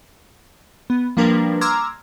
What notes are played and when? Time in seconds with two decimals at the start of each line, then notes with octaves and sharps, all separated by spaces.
0.90 B3
1.17 F3 G3 A#3 D4 A#4 B4
1.61 A#5 C6 D6 E6 F6 G#6